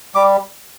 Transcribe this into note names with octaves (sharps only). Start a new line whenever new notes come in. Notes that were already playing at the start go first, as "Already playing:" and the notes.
G3 D6